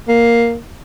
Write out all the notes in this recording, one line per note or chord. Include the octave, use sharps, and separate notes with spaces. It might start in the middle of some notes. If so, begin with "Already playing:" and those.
A#3